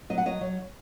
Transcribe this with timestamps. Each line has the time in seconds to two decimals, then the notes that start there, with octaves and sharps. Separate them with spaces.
0.10 F#3 D#5
0.18 F#5
0.26 F#3 D#5
0.41 F#3